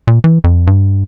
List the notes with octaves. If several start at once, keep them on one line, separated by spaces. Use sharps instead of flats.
A#2
E3
F2
G2